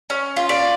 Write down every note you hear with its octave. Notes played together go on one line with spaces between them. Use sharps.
C#4
F4
D5